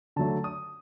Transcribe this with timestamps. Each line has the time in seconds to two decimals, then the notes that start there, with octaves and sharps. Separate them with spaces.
0.16 D3 F#3 A3 A5
0.44 D#6